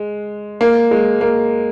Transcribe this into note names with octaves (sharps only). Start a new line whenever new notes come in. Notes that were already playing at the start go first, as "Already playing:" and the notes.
Already playing: G#3
A#3
G#3
A#3